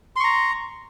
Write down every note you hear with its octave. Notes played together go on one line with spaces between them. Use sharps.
A#5 C6 C#6